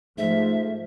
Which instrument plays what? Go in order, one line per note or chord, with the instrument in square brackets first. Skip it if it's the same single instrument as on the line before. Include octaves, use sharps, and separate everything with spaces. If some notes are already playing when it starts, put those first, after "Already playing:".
[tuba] G#2 [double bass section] F3 [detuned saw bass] A3 [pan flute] E5